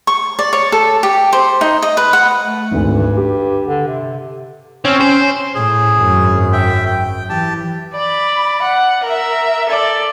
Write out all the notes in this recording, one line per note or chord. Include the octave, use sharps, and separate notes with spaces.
C#6
D5
C#5
A4
G4
C5
D#4
D#5
B4
F#5
A3
G#1 D2 E3
G2
G4
D3
C3
C4 C#4
C5
A2 G#4
G#1 F#2
E5 G5
G5
E3 G4 A5
D5 B5
F#5
A#4 E5
A4 D5